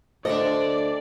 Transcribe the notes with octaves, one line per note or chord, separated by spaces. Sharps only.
D2 A#2 D4 A4 C5 D5 D#5